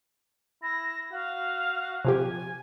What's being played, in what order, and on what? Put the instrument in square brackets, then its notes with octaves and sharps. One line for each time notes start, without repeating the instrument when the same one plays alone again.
[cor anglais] E4 [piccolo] A#6
[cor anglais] F#4 [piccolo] F5
[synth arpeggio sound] C3 F3 G4 [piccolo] G#5